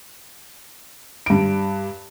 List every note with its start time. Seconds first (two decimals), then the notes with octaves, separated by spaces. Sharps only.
1.26 G2 D7